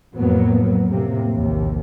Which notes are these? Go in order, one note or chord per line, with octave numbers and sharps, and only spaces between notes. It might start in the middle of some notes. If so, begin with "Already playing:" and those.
F2 A2 F#3 A#3 B3
A2 C3 A#3
A#1 D#2